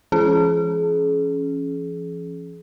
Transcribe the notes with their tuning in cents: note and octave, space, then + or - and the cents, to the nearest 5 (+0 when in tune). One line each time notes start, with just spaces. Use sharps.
F3 -45 C#4 +0 G#4 +35